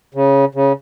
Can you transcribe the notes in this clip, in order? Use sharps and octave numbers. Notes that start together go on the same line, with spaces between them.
C#3
C#3